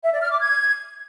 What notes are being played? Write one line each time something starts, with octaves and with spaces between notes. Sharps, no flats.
E5
D5
F6
D6
G#6